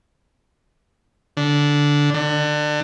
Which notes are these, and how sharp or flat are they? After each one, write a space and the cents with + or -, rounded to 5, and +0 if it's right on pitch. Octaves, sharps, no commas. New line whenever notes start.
D3 -10
D3 +30